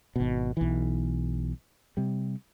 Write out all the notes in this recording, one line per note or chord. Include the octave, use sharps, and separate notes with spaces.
G#1 B2
B1 E3
C3 G3